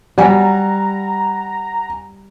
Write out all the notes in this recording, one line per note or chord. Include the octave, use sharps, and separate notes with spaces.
G3 F#5 G#5 A#5